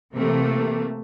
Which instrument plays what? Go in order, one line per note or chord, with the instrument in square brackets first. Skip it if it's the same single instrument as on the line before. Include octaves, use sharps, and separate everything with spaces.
[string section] C3 E3 A3 A#3